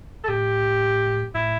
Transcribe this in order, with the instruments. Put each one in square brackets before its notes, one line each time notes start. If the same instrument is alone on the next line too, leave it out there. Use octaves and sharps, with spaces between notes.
[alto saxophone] A4
[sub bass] A2 [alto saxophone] G4
[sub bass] A2 [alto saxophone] E4